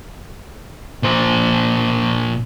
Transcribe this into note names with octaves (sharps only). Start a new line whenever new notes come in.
A#2 C5